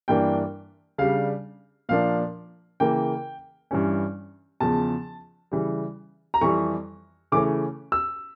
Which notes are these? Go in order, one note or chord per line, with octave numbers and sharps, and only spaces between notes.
G2 E3 A#3 D4 G5
C#3 G3 D4 F5
A#2 F3 A#3 D4 F5
C#3 E3 A#3 G5
G2 E3 G3 C#4
E2 C#3 F3 A5
C#3 E3 G3
A#5
F2 E3 G3 C#6
C#3 E3 A3 C#4 D6
E6